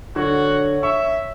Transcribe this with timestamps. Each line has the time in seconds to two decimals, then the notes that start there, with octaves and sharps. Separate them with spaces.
0.16 D3 F#4 C#5
0.83 E5 C#6